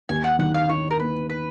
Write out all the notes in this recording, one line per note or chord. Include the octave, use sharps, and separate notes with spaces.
D#2 G#5
F#5
D#3 F#5
F5
D#4 C#5
A#4
A#3 B4
B4